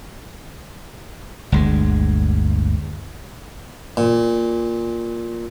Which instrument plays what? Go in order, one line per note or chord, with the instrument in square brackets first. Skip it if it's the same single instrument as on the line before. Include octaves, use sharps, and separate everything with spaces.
[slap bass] G1 D2 G#3
[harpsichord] A#2